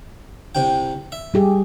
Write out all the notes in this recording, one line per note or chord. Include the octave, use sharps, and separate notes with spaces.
C2 C3 G5
E5
G3 G4 G#4